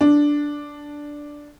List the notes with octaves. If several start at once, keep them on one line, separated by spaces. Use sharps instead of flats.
D4